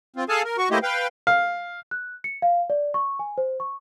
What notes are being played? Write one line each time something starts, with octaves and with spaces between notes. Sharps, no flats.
C4 F4
G#4 A4 F5 G#5 A5
A#4
F#4 C#6
A3 A#3 E4 G4 C5 D#5
B4 F5 G5
F5
F#6
C#7
F5
D5
C#6
G#5
C5
C#6